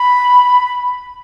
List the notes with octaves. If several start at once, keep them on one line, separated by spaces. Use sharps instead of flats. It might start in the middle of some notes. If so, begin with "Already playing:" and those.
Already playing: B5